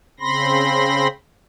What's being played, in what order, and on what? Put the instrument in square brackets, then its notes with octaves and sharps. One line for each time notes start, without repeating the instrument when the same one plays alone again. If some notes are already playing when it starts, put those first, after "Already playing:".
[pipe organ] C#3 C4 B5 C6 A#6